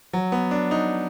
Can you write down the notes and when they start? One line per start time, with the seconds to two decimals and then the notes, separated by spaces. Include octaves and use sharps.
0.13 F#3
0.32 B3
0.51 D4
0.71 D#4